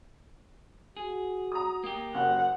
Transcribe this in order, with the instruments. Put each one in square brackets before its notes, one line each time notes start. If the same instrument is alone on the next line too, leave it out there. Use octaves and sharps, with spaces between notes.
[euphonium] F#4 [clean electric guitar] G#4
[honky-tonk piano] A#5 D#6
[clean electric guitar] A#3 G4
[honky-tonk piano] F#1 [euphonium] F#2 [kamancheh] F#5